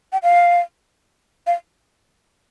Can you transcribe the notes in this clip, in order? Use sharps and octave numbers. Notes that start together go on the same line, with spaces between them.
G5
F5
F5